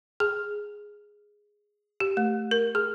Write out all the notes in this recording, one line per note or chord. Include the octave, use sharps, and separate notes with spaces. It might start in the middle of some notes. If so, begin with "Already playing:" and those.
G#4
G4
A3
A#4
G#4